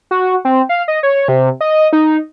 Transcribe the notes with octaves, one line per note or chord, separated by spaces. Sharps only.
F#4
C4
F5
D#5
C#5
C3
D#5
D#4